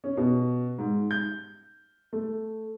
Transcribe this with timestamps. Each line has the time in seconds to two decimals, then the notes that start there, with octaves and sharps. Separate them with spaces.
0.04 C#4
0.17 B2
0.78 G#2
1.11 G6
2.13 A3